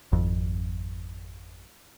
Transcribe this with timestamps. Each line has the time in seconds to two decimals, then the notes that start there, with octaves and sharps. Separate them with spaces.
0.12 G#1 F2